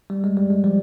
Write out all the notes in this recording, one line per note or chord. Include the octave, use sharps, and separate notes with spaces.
G3
G#3
G3
G#3
F3 G3